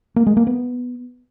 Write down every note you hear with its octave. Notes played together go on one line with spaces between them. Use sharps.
A#3
G#3
A#3
B3